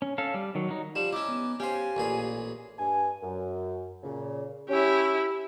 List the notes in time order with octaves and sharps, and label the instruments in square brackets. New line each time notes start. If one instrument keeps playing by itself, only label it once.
[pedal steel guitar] C#4
C#4 A4 F5
G3
D#3 F#3
F#3 D#4
[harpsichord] F3 G3 [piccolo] E7
[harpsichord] C#4 D#4 [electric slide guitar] E4 [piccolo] D6
[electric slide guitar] B3
[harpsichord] C#4 C5 [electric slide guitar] G4 F5 [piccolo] G#5
[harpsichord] A1 A#2 G#4
[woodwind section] G2 G#5
F#2
A#2 C#3
[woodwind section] C#4 [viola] E4 G4